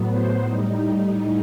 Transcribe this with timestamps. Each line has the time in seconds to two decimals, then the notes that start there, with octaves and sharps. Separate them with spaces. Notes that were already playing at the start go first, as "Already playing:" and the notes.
Already playing: A2 F#3 B3
0.11 C5
0.43 A2 G3 D#4